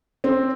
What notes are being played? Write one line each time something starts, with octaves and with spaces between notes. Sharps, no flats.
C4